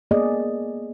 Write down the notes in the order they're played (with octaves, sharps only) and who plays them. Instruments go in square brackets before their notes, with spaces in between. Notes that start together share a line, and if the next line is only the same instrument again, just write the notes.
[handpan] A#3 B3 G#4 D5 D#5